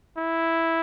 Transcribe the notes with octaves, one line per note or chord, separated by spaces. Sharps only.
E4